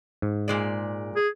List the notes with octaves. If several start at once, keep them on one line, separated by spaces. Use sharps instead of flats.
G#2
A#2 G#3 D5
G#4